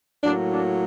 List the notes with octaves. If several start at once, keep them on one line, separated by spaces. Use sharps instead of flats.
A2 F#3 A#3 D4
D4